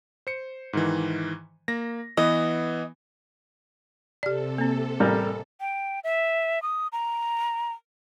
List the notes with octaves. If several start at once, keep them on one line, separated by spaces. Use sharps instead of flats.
C5 C#7
G#2 D#3 E3
A#3 A#6
E3 B3 D#5
C3 G4 A4 D5
A#3 C4
A1 G3 A#4
G5
E5
D#6
A#5